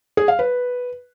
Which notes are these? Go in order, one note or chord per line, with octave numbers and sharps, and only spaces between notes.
G#4
F5
B4